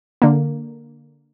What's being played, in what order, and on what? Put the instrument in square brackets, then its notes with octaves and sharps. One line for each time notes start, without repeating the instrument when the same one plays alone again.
[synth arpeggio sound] D3 A#3